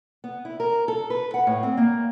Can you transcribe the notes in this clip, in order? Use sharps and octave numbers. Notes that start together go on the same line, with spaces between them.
B3
E4
A#4
A4
B4
F#5
A2
C4
A#3